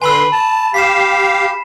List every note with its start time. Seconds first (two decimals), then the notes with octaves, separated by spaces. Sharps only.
0.02 D3 B4 G#5 B5 C6 E6
0.32 A5
0.74 G4 F5 B6 C7 E7